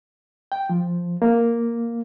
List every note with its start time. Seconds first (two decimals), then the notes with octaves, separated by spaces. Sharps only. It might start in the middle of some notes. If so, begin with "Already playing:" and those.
0.52 G5
0.69 F3
1.22 A#3